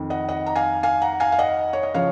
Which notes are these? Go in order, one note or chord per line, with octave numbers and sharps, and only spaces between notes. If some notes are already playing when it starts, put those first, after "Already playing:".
Already playing: F2 D#3
D#5 F#5
D#5 F#5
A#5
F5 G#5
F5 G#5
F#5 A#5
F5 G#5
F5
D#5 F#5
C#5
D#5
C#3 F3 C#5 F5